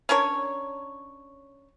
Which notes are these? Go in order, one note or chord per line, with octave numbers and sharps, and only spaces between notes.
C#4 D4 A#4 C#5